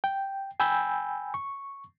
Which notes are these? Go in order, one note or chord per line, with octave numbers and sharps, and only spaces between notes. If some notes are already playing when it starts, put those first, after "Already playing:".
G5
G5 G#5 B5 E6 G6
C#6